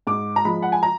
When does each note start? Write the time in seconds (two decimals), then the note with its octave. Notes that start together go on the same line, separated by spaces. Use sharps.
0.07 G#2 D6
0.36 A#5
0.45 F3 G#3 B5
0.63 F#5
0.72 G#5
0.83 A#5